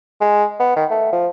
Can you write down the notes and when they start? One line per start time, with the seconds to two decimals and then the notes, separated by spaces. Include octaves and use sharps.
0.21 G#3
0.60 B3
0.76 D#3
0.90 A3
1.12 F3